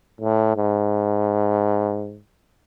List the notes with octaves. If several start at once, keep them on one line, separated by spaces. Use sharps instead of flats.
A2
G#2